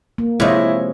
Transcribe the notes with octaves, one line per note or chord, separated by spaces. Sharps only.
A#3
C3 F3 G#3 E4 C#5 D#5